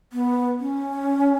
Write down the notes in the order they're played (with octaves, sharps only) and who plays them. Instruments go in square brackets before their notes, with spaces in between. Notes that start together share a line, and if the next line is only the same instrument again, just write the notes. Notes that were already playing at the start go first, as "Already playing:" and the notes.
[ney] B3
C#4